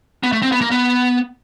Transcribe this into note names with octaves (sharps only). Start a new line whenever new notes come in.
B3
A3
C4
B3
A#3
B3